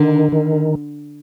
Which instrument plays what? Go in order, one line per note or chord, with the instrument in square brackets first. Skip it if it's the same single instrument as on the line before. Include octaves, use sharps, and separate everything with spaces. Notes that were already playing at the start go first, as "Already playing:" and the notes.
Already playing: [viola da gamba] D3 [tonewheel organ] D#3
[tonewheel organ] D#3